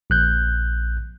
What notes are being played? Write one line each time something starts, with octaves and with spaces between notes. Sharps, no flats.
A#1 F#6 G6